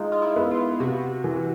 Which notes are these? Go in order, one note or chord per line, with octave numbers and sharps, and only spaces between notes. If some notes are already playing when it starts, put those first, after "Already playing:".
Already playing: G#3 D#4 F4
F4
E4
B3
F4
C3 F#4
E3